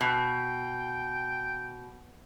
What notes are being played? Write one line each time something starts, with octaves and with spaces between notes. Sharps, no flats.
B2 G5